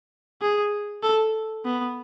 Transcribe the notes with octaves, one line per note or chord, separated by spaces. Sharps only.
G#4
A4
B3